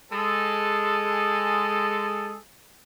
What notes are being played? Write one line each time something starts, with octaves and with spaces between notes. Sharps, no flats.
G#3 G#4 A4